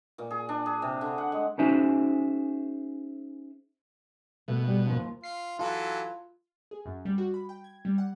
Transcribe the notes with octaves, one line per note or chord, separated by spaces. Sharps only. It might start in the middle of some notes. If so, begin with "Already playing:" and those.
A#2
G#4
D4
G#4
C3
D3
F#5
G#3
C#4 D#4 F#4 G#4 C5 E5
B2 A3
G3
D#2 F3
F4 C7
E3 F#3 F4 A4
G#4
F#2
G3
F#4
B5
G5
G#6
G3
F#5